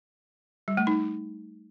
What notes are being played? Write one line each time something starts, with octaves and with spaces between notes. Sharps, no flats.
G3
A3
D#4